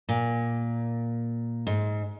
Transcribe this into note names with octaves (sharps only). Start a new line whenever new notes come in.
A#2
G#2